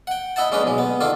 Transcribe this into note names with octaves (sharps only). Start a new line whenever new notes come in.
F#5 G5
E4 D#5 E5 F#5 A5
G#3 C#4 D4 B4 D#5
B1 G#3
B3
D#3 D4 F4 A4